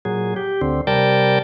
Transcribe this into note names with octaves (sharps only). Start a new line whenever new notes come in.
A#2 F#3 G#4
G4
D2 D3 C4
C3 G3 A#4 D5 G5 A5